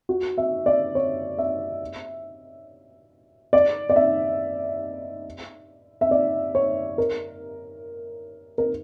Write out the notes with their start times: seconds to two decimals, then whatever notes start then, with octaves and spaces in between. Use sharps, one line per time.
0.09 F#4
0.38 E5
0.66 D5
0.95 C#5
1.38 E5
3.53 D5
3.90 D5
3.96 E5
6.01 E5
6.11 D5
6.55 C#5
6.98 A#4
8.58 A#4